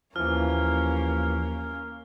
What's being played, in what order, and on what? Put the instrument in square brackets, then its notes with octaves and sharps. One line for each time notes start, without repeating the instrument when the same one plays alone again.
[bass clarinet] D#2 [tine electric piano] E3 F3 [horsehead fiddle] A#3 C#4 [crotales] F6